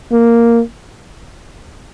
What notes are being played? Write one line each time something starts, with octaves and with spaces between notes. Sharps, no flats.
A#3